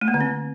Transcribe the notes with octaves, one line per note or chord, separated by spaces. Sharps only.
A3
A#3
D3
C4